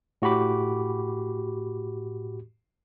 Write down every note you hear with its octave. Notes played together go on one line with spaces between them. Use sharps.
A2 F#4 G4 B5 D6